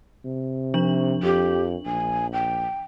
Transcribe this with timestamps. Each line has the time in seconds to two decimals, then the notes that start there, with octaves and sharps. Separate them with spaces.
0.25 C3
0.74 F3 D4 F#7
1.23 F2 G4
1.86 A#1 G#5
2.33 G5